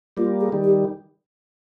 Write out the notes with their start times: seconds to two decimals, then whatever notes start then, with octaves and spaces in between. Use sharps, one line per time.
0.17 G3 A#3 F4
0.41 G#4
0.52 D#3 G3
0.64 G4